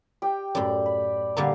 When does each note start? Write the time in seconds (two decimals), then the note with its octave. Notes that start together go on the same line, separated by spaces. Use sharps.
0.22 G4 G5
0.55 F#2 A2 D5
0.86 B5
1.37 A#2 D3 G3 F5 A#5